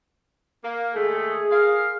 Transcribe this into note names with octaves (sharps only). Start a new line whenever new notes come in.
A#3
D#2 G#3 A3 G#4
F4 A#4 F5